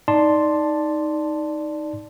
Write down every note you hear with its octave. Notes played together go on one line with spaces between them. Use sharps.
D#4 D5 A5 C6